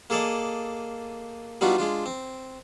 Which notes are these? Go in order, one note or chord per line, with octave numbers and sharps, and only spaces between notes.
A#3 G#4 A4 D5 D#5
G3 B3 D4 D#4 F4 F#4
G#3 D4 F4
C4